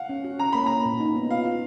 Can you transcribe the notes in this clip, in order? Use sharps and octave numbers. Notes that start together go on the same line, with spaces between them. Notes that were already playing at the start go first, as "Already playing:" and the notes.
Already playing: F5 F#5
C#4
F#4
C#4 A#5
A#3 B5
A#3 A#5
A#2
D#4
B3
F4 F5
F4